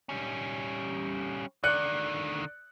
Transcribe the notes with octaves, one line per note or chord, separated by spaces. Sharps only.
G3 C#4
D3 D#3 D5 F#6 C#7